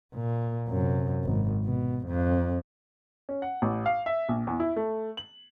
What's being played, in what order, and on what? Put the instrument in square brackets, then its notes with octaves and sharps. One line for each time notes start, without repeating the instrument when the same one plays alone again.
[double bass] A#2
F#2 C3
G#1
B2
F2
[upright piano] C#4
F#5
A1
F5
E5
A#1
E2
E4
A3
F#7